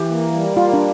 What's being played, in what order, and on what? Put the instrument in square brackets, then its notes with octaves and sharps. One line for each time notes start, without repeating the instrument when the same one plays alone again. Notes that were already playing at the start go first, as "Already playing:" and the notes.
Already playing: [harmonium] E3 [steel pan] G4
[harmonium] A#3
G3
[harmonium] A#3 [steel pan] F4
[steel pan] D4